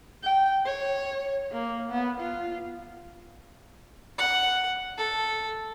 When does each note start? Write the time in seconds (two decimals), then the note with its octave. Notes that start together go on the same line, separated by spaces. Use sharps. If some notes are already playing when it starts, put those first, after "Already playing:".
0.23 G5
0.65 C#5
1.52 A#3
1.90 B3
2.20 F4
4.18 F#5
4.98 A4